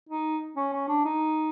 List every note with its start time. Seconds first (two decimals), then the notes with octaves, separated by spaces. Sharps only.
0.09 D#4
0.56 C#4
0.73 C#4
0.89 D4
1.05 D#4